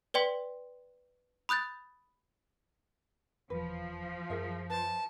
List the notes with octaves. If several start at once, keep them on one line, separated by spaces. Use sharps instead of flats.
B4 D5 G5 C6 B6
B5 D#6 F#6 G6 A6
F1 E2 F3 B4
F#2 G#3 G#4 A#4 E5
B4 C5 A5